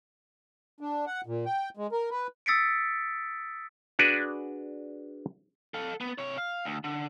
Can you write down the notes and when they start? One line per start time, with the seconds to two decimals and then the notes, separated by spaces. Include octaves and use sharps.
0.81 D4
1.07 F#5
1.26 A#2
1.46 G5
1.77 G#3
1.92 A#4
2.11 B4
2.46 D#6 E6 A6 B6 C#7 D7
3.99 D4 F#4 G#4 B4 D5
5.74 A4 F5
6.01 B3
6.18 C3 C#5
6.38 F5
6.65 D2
6.84 D3